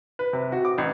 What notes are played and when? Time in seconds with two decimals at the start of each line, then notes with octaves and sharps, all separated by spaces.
0.19 B4
0.33 C3
0.52 F#4
0.65 D6
0.78 A1